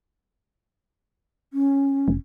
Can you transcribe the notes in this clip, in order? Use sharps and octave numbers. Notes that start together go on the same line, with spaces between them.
C#4
F1